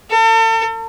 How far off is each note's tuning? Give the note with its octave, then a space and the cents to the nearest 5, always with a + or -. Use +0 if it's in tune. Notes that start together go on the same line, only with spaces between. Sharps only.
A4 +40